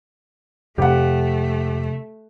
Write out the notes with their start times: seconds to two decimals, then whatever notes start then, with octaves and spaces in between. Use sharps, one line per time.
0.78 F2 C3 A3 G4 F#5